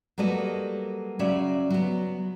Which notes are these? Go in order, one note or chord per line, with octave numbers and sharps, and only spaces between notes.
F#3 G3 A#3 A4 B4 D#5
C#3 F#3 C#4 D5 E5
F#3 B3